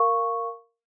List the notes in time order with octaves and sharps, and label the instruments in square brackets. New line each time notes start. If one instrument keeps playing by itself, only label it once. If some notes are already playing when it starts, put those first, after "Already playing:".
Already playing: [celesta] A#4 F5 C#6